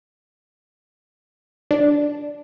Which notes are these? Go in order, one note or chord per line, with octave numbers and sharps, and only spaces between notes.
D4